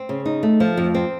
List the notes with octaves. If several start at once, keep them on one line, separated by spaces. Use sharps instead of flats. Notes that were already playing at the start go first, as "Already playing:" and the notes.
Already playing: C4
C#3
D#4
A3
F3
F2
C4